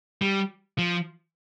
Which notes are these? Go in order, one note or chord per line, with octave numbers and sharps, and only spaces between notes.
G3
F3